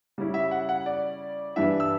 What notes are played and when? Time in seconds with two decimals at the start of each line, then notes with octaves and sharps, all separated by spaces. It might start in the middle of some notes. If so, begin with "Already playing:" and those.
0.18 C#3 G3 C#4 E4
0.34 E5
0.51 F#5
0.69 F#5
0.86 D5
1.56 G2 E3 G3 D4 E5
1.80 E6